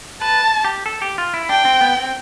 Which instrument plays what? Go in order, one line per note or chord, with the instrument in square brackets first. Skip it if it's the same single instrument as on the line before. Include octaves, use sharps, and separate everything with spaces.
[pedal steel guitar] B4 [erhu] A5
[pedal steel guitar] G4
A4
G4
F4
E4
[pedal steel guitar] D4 [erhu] G5
[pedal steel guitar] C4
B3
C4